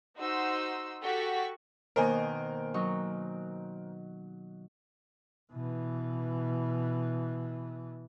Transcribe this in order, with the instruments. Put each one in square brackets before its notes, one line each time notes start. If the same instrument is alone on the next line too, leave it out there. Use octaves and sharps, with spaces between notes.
[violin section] D#4 F#4 C5 C6 E6
F#4 G4 A4 C#6 B6
[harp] B2 D#3 A#3 [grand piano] A#4 C5 G#5
[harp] F#3 D#4 C#6
[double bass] B2 E3